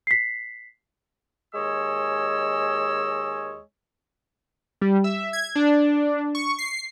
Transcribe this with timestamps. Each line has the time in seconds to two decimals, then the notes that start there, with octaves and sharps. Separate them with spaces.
0.07 B6 C7
1.55 D#2 G#3 C#5 D#5 G#5 E6
4.82 G3
5.04 E5
5.33 G#6
5.55 D4
6.35 C#6
6.58 C7